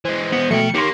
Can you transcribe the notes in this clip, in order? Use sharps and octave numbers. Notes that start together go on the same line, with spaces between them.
E3 G#3 C5
B3
B2 F3 A3 G5 C#7
A#3 D#4 G4 C#5 C6